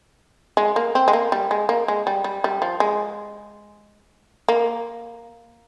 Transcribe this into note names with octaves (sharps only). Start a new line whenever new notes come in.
G#3
A#3
C4
G#3
A#3
G3
G#3
A#3
G#3
G3
G3
G3
F3
G#3
A#3